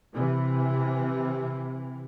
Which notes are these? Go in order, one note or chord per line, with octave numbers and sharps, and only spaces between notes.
C3 E3